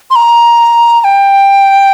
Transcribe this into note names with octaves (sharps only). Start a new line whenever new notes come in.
C6
A#5
A#5
G5